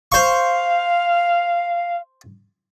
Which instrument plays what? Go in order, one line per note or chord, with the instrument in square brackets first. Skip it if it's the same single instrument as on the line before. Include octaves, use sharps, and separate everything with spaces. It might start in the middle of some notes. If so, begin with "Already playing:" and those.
[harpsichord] C5 C#6 [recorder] F5